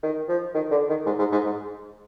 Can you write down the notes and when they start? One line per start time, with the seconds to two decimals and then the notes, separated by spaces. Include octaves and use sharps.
0.03 D#3
0.29 F3
0.54 D#3
0.71 D3
0.89 D#3
1.06 G#2
1.19 G#2
1.32 G#2
1.45 G#2